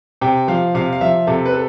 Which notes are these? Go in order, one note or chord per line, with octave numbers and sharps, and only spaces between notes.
C3 G5
F3 F5
C3 F5
F5
F3 E5
C3 A4
B4
A4